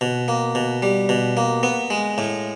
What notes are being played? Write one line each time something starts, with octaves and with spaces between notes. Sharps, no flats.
B2
A#3
B2
G3
B2
A#3
B3
G#3
A2